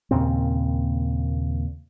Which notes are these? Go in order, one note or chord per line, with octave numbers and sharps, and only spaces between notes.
D#2 A#2 C#3 C4